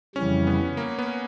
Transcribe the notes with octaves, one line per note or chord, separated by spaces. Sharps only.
F2 C#3 E3 G3 C#4
B3
A#3
B3